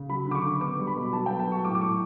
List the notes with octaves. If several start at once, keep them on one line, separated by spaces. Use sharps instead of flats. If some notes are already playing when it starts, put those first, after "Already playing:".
Already playing: C#3
F#3 B5
D3 D6
C#6
D3
B3 D6
G3
B5
B2
F#3 A5
B3 G5
A5
F#3 C#6
A2 D6
D6
A2 C#6